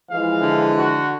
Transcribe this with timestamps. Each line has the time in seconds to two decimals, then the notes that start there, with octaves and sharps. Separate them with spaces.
0.10 E3 F3 G#3 F5
0.42 D3
0.78 F#4